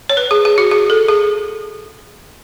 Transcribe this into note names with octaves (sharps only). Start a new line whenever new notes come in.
C#5
B4
G#4
G#4
F#4
G#4
A4
G#4